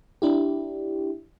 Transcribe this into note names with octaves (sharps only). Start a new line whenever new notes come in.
D4 E4 G4